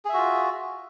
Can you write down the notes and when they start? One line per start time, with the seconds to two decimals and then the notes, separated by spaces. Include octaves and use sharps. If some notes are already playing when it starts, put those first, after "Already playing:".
0.05 G#4
0.09 E5
0.14 F#4
0.18 F4